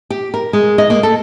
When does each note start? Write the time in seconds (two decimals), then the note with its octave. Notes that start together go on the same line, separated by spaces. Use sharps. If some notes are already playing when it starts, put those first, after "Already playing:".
0.10 G4
0.34 A#4
0.53 G#3
0.78 D#5
0.90 A#3
1.03 A4